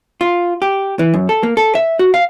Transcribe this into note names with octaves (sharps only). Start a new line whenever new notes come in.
F4
G4
E3
F#2
A4
A#3
A4
E5
F#4
F5